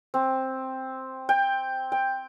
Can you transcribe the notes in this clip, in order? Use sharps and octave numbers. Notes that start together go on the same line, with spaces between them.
C4
G5
G5